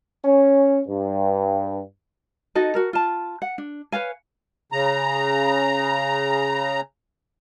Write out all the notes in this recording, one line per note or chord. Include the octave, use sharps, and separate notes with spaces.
C#4
G2
D#4 F#4 A4 D#5
F#4 A#4
F4 A5
F#5
D4
B4 C#5 F5 G#5
C#3 A#5